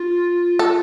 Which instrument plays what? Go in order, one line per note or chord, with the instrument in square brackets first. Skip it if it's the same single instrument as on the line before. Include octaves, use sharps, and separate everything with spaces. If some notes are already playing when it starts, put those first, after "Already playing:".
Already playing: [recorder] F4
[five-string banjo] A4